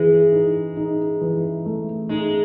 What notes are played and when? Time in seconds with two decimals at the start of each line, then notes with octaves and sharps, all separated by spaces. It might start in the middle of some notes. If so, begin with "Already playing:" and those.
Already playing: E3 G#3
0.33 D#4
0.77 D#4
1.21 E3
1.66 A3
2.09 G#3 D#4